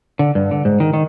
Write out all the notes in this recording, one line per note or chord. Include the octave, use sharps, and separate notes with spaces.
D3
G2
D3
G#2
D#3
D#3